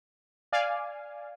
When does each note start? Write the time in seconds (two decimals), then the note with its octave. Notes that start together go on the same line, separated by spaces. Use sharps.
0.52 D5 F5 G#5